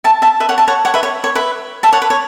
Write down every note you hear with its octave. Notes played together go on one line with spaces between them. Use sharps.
E5 A5
E5 A5
B4 E5
C#5 F#5
E5 A5
C#5 F#5
C#5 F#5
B4 E5
C#5
C#5
B4 E5
E5 A5
C#5 F#5
B4
C#5